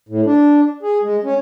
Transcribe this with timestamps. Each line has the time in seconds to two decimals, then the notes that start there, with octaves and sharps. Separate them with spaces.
0.09 A2
0.25 D4
0.83 G#4
1.03 G#3
1.24 C#4